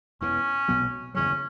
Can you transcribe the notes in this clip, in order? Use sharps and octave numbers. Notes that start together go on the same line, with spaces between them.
E1 E2 E3 C#4
B1 B2 F#3 B3
F#1 E2 C#3 F#3 C#4